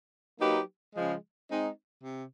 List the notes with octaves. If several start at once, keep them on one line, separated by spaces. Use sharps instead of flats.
F#3 A#3 D#4 G4 B4
C#3 F3 G#3
G#3 C4 D#4
C3